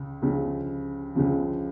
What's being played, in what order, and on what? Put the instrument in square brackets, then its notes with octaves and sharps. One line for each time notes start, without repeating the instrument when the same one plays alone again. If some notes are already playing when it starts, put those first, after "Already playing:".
Already playing: [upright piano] C#2 C#3
C#2 C#3 F3
C#2 C#3 F3